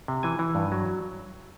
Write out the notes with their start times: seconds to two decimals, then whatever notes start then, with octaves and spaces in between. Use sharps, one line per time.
0.08 C3
0.23 E3 G#5
0.39 E3
0.55 G2
0.72 F#3